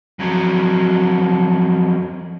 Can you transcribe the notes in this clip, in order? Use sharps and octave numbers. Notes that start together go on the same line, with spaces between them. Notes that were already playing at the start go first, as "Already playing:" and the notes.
F2 F#3